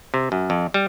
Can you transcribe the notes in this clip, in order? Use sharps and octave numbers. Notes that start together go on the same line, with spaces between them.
C3
F#2
F2
G3